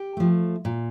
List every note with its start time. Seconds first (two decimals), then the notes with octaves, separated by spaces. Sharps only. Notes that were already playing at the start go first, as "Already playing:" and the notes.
Already playing: G4
0.17 F3 A3
0.65 A#2